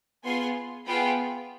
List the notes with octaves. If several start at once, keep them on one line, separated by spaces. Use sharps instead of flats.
B3 F4 G#4 G#5 C6
B3 F4 G#4 G5 B5